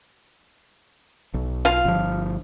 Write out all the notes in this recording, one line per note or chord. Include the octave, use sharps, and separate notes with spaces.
B1
F4 F5
G1 F3